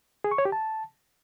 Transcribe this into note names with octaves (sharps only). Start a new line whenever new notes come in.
G#4
C#6
C#5
G4
A5